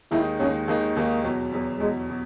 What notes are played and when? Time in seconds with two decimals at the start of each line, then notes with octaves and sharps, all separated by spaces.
0.11 D#2 D#3 G#3 D#4 E4
0.40 D#2 D#3 G#3 C#4 D#4
0.68 D#2 D#3 G#3 A#3 D#4
0.95 D#2 D#3 G#3 A#3 D#4
1.24 E2 B2 F#3
1.52 E2 B2 F#3
1.80 E2 B2 F#3 G#3
2.10 B2